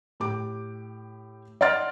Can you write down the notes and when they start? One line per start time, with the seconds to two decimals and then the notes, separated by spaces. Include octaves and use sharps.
0.20 A2 G4 D6
1.61 D5 D#5 F#5 C6 F6 A6